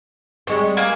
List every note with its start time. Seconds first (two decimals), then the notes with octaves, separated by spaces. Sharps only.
0.47 G3 G#3 C4 C#6
0.77 A#3 G#4